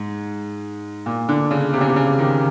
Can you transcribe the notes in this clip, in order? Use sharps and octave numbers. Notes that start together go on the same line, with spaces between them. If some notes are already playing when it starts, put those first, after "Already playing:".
Already playing: G#2
A#2
D3
C#3
C3
C#3
C3
C#3
D#3